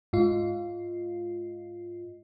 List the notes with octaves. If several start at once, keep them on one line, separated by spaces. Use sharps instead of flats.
G#2 F4